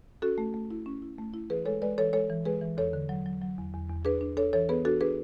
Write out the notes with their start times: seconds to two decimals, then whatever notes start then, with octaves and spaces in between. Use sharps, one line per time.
0.22 C#4 F#4 A4
0.38 A3
0.54 A3
0.71 E4
0.86 C#4
1.02 E4
1.18 A3
1.34 E4
1.50 E3 G#4 B4
1.65 G#3 A4 C#5
1.82 G#3 B4 D5
1.98 E3 A4 C#5
2.13 G#3 A4 C#5
2.30 E3
2.45 G#3 G#4 B4
2.61 E3
2.77 E2 A4 C#5
2.93 D3
3.09 F#3
3.26 F#3
3.42 F#3
3.58 E2
3.74 E2
3.89 E2
4.05 D4 G#4 B4
4.21 D4
4.37 D4 A4 C#5
4.53 E3 A4 C#5
4.69 B3 G#4 B4
4.85 D4 F#4 A4
5.01 D4 G#4 B4